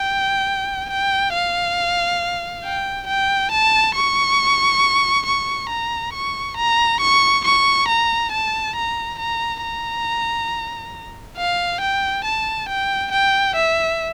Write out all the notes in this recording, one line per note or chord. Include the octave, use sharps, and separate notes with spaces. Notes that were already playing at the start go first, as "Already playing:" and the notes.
Already playing: G5
G5
F5
G5
G5
A5
C#6
C#6
A#5
C#6
A#5
C#6
C#6
A#5
A5
A#5
A#5
A#5
F5
G5
A5
G5
G5
E5